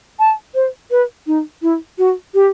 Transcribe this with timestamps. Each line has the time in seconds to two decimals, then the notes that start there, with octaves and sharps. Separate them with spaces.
0.19 A5
0.55 C5
0.91 B4
1.27 D#4
1.62 E4
1.98 F#4
2.34 G4